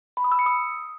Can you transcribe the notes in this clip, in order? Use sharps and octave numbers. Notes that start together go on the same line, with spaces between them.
B5
D#6
E6
C#7
D#6